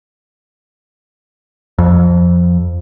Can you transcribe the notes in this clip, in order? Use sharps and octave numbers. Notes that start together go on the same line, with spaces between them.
F2